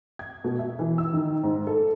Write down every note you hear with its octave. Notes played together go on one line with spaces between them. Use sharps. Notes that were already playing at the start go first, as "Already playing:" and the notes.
G#6
B2
E5
E3
E6
D#3
G#2
A4